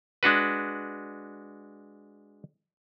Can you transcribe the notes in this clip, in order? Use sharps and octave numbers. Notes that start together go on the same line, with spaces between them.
G#3 D4 F#4 B4